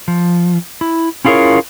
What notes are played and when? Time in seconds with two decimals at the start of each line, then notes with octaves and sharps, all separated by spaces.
0.08 F3
0.81 E4
1.25 C#4 E4 F4 G#4 A#4 C#5